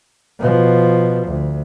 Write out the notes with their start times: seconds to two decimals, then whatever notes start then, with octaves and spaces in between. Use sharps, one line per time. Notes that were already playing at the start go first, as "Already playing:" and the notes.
0.40 B2 F3
1.27 D2